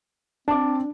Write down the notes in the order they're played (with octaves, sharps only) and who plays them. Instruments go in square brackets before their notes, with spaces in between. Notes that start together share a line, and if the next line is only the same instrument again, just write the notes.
[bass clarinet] C4 [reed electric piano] D4 [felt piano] A5 D6